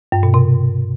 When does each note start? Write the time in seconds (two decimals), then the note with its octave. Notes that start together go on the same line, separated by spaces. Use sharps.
0.12 G2
0.23 B2
0.34 C3